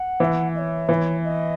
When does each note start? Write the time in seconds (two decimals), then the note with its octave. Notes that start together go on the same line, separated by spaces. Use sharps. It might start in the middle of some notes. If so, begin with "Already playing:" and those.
Already playing: F#5
0.20 E3
0.55 D#5
0.58 C#5
0.89 E3
1.24 D#5